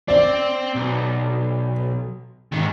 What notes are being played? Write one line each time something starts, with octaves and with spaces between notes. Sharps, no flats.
C4 D5
B1
G#2 D#3